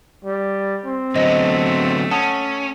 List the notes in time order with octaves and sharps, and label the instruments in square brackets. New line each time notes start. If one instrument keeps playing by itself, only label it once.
[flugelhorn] G3
C4
[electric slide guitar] D3 F#3 B3 [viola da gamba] A3 [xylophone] C5 D#5 A#6
[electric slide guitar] C#4 [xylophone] F#5 A5 D#6